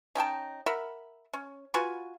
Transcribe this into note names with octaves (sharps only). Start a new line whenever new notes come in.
C#4 D#4 G5 A5
A#4 E5 F#5 B5
C#4
F4 F#4 B4 G#5